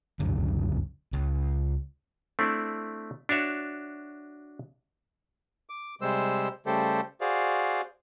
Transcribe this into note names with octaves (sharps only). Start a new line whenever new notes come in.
E1 C#2 F#2 D3
C#2
A3 C4 D4 E4
D4 F#4 C#5 E5
D6
C3 G3 G#3 C5 E6
C#3 G3 A3 G4 A4 C5
F#4 G#4 C5 D5 F5